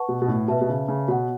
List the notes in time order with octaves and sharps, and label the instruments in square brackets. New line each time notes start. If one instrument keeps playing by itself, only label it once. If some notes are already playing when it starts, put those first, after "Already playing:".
Already playing: [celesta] B4 F#5 A5 C#6
[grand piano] B2
B2
A2
[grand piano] B2 [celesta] B4 E5 A5
[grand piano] B2
C#3
C#3
[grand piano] B2 [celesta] F#4 C#5 F#5